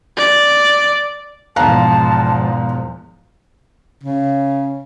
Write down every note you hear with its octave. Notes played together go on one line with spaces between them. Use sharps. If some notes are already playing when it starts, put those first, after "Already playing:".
D5
E1 E2 G#2 F3 F5 A5 A#5 F#6
C#3